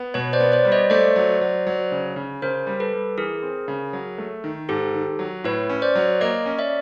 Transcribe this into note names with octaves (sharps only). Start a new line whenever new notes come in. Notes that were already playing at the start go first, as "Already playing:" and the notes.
Already playing: B3
B2 B4 C#5
C5 D5
B3
C5 D5
G3
C#5 D#5
A3 C5 D5
F#3
F#3
F#3
C#3
C#3
C#3 A#4 C5
G3
A4 B4
G3
E3 G#4 A#4
C4
C#3
F#3
A3
D#3
G#2 G4 A4
D#3
F#3
A2 B4 C#5
C#4
C5 D5
F#3
A#3 C#5 D#5
C#4
D5 E5